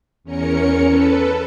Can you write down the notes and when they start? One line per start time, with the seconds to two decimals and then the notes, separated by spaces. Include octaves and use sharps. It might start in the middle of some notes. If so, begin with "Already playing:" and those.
0.24 E2 C#4 A#4 C#7
0.86 A4 B4